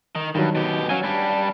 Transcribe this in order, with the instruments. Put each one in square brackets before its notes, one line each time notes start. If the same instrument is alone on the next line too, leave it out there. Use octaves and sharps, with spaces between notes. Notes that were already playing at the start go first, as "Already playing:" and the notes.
[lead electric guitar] D#3
[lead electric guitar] G2 [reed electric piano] D#3 F#3
[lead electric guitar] B2 G4
[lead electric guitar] F#3 [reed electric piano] C#4 F5 G#5
[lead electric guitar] G3 D4